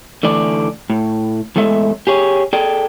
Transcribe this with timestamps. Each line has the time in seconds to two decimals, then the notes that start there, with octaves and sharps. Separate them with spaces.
0.23 D3 E3 A3 D5
0.90 A2
1.56 E2 A2 G#3 A4 E5
2.07 G4 G#4 C#5
2.53 G#4 A4 D5 G5